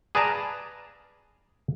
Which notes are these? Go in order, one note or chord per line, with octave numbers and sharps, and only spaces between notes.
G#4 B4 D5 F5 A5 A#5